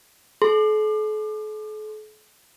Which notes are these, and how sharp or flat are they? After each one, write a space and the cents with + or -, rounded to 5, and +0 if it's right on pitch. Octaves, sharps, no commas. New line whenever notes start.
A4 -45 C6 +0